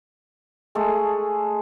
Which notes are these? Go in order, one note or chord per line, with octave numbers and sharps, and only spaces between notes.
G#3 A3 G#4